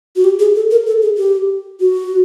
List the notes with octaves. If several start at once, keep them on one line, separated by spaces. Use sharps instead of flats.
F#4
G4
G#4
A4
A#4
A4
G#4
G4
F#4